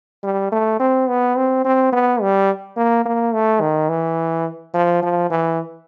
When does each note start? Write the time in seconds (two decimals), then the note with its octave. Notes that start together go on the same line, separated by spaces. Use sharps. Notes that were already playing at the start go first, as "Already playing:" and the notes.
0.24 G3
0.52 A3
0.80 C4
1.08 B3
1.36 C4
1.65 C4
1.93 B3
2.21 G3
2.77 A#3
3.05 A#3
3.33 A3
3.61 D#3
3.89 E3
4.74 F3
5.02 F3
5.31 E3